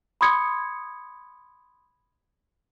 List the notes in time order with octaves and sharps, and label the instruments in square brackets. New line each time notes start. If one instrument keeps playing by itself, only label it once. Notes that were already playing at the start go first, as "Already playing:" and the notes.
[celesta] B5 C6 D#6 G#6 C#7